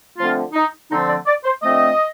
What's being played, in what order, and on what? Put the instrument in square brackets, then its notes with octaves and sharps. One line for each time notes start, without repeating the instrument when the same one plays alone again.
[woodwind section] D3 F3 A3 C4 F4
D#4
D3 F3 A3 C4 D#4
D5
D5
C5
D3 F3 A3 C4 D#5